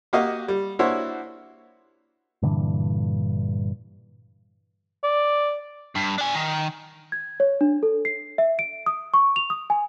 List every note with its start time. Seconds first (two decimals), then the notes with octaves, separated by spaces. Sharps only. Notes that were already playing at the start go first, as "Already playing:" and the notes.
0.13 A#3 F#4 G4 D#5 F5
0.48 G3
0.79 A#3 D4 E4 F#4 C5 C#5
2.43 G2 A#2 D3 E3
5.04 D5
5.96 G2
6.18 D4 G#5
6.35 D#3
7.12 G#6
7.40 C#5
7.61 D4
7.83 A4
8.05 C7
8.38 E5
8.59 D7
8.86 D#6
9.14 C#6
9.36 F7
9.50 D#6
9.70 G#5